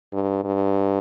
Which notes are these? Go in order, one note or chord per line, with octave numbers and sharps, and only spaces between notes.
G2
G2